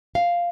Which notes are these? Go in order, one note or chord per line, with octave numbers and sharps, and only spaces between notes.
F5